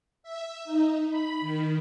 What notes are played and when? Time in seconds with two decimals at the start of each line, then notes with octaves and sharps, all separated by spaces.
0.23 E5
0.65 D#4
1.09 B5
1.41 D#3